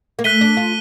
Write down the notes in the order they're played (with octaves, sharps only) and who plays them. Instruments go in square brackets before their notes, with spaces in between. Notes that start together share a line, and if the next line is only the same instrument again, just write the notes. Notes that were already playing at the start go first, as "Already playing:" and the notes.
[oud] A#3
[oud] A3 [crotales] F#6 B6 D#7 G7
[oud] D4
F4